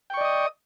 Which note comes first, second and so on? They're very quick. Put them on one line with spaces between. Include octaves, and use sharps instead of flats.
G5 C#6 D5 D#5 D#6